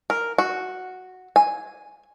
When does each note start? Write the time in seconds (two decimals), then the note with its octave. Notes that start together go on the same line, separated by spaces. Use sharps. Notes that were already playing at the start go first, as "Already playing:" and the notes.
0.10 A#4
0.38 F#4
1.36 G#5